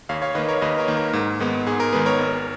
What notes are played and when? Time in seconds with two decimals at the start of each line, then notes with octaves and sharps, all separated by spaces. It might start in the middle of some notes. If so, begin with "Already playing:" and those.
0.09 D#2 C#5 F5
0.22 C#5 F5
0.35 D#3 A#3 B4 D#5
0.49 A#4 C#5
0.62 D#2 B4 D#5
0.78 A#4 C#5
0.88 D#3 A#3
0.97 A#4
1.13 G#2
1.40 D#3 G#3 B3
1.66 G#2 G#4
1.80 A#4
1.93 D#3 G#3 B3 G#4 B4
2.06 A#4 C#5
2.19 G#1